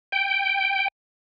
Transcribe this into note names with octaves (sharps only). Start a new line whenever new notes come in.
G5